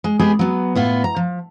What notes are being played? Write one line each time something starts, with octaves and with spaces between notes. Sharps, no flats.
G#3
G#3 B3 G4 G#4
F#3 B3
A2 B3 F4
A#5
F3